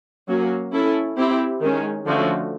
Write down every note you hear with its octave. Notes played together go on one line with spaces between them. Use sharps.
F#3 A#3 C#4 F#4
C#4 E4 A4
C4 E4 G4
D#3 G#3 C#4
D3 F3 A3 C#4 F#4